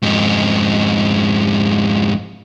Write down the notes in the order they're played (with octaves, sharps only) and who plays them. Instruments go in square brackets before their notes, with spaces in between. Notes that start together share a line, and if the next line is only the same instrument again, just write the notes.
[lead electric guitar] F2 G#2